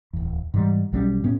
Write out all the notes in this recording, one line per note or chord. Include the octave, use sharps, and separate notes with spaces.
D1 E2
G#2 E3 G3
B1 F#3 G3 C#4
A2 B3 C#4